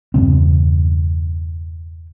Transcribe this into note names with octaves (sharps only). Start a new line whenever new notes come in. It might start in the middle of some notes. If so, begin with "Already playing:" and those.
E2 G2 C#3 C4